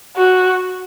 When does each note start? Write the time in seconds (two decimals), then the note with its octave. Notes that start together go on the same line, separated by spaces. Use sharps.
0.16 F#4